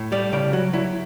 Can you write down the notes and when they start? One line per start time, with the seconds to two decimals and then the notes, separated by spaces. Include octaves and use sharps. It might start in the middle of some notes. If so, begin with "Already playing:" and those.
Already playing: A2
0.12 G3 D5
0.32 C#3 D5
0.53 F#3 F#4
0.73 F#3 E4